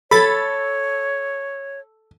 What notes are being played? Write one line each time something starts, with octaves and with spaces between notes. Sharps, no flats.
A4 C#5 B5 A6